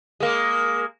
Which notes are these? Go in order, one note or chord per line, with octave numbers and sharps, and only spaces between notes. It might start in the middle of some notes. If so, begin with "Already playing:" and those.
G#3 A#3